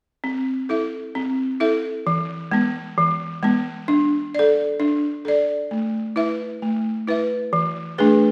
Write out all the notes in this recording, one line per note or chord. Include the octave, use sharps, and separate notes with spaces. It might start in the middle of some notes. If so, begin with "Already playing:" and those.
C4
E4 A4 E5
C4
E4 A4 E5
E3
G#3 B3
E3
G#3 B3
D4
A4 D5
D4
A4 D5
A3
E4 B4 E5
A3
E4 B4 E5
E3
A3 D4 G#4 B4